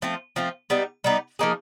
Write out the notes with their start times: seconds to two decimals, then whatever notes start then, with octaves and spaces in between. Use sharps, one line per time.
0.02 F3 A3 C4 F4
0.36 F3 A3 C4 F4
0.70 G3 B3 D#4
1.04 G3 B3 D#4
1.39 F3 A#3 D#4 G#4